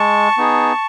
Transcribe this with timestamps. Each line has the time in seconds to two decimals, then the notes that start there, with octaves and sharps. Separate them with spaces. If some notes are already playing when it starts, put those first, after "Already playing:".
Already playing: G#3 A5 C#6
0.37 B3 D#4 G#4